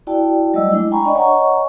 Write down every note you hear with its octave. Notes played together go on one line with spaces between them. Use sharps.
E4 F#4 D5 G5 A5
F#3 G3 A3 D5 D#5 E6
G#3 D4 E4
G5 G#5 A#5 B5 C#6
D4 D5 D#5
C#5 D#5 F#5 G#5 A#5 C#6